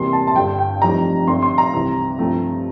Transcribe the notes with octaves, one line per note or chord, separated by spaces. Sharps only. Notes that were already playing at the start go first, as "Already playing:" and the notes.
Already playing: E2 C3 G3 A#3 C6
A5
A5
G1 G2 D3 G5
G5
F1 F2 E3 G3 A#5
G1 G2 D3 G3 C4 C6
C6
A#5
C2 C3 E3
G2 F3 A3 C4